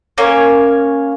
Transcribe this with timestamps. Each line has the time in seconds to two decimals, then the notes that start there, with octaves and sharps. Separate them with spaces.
0.18 A#3 C#4 C#5